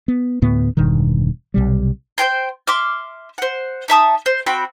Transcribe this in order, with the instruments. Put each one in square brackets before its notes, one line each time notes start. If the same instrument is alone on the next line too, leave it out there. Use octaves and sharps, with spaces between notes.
[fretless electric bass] B3
D2 A2 B3
E1 G2 B2 D#3
B1 C3 G3
[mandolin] C5 C#5 G5 C6
E5 C6 D6 F6
C5 F#5
D#4 E5 A5 D#6
C5
C4 F#4 G5 B5